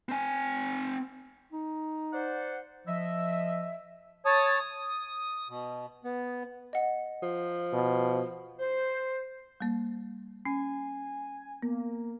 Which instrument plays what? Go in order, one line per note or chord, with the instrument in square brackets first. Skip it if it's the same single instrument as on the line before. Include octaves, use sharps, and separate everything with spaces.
[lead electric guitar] C4 G#5
[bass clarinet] D#4
[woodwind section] C5 D5 F#5
[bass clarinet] F3 [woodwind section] D#5 E5
[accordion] C#5 A5 D#6
D#6
B2
B3
[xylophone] D#5 F#5
[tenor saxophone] F3
[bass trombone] B2
[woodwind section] C5
[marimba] G3 A#3
[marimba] C#4 [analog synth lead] G#5
[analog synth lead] A#3 [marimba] B3